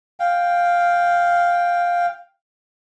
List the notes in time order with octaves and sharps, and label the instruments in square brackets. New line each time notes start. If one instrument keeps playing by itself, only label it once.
[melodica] F5 G5